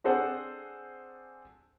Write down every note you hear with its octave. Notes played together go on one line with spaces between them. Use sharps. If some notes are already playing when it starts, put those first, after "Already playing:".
C4 D4 G#4 A4 C5 F#5